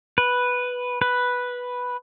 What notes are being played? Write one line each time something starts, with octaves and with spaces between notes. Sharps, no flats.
B4
B4